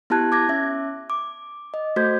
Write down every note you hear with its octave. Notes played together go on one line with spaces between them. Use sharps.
B3 E4 G4 A5 F#6 G#6
D6 G#6 A#6
C#4 E5
D6
D#5
A3 F#4 A4 C5 G6 G#6